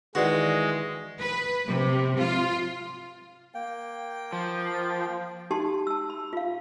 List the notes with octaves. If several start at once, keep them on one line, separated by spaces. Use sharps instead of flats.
D#3 E3 G#3 F#4 G#4 B4 D5
B4
C3
F4
A#3 G5
F3
D#4 F#4 G4 A5 C6
A5 E6
B5
F4 F5